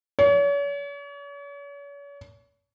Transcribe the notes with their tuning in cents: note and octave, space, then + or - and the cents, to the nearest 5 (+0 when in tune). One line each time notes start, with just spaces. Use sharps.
C#5 +40